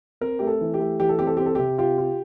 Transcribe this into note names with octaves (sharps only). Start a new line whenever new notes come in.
C4 A#4
A3 G4
A4
E3
G4
A3
E3 G4
A4
C4 G4
A4
C4 G4
A4
C3 G4
F4 G4
F4